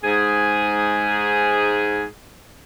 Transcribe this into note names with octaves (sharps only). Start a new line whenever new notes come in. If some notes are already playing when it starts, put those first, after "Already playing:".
G#2 G#4